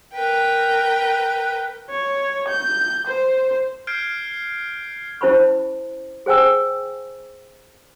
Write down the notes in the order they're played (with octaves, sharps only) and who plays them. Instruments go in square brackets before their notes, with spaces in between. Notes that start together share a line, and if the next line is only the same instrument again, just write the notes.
[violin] A#4 G5 [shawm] B4
[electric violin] C#5
G6
C5
[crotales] F6 G6 G#6 C7 D7
[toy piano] C#4 E4 C5 A5 B5 C#6
G#4 C5 G5 G#5 E6